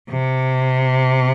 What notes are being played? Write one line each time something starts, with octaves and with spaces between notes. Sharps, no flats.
C3